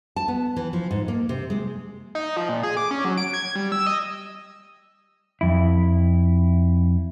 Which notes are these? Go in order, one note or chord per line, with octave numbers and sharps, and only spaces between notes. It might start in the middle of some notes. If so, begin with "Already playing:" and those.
A5
B3
E3
F3
G#2
A#3
C3
G#3
D#4
F3
A#2
G#4
D6
C#4
F#3
D7
G#6
G3
E6
D#5
F2 E4